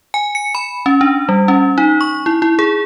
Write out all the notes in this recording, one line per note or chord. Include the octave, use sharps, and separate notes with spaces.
G#5
C#7
B5
C#4
D4
G3
C#4
D#4
C#6
E4
E4
G#4